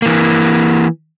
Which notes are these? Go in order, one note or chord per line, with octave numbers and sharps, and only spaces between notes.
E3 A#3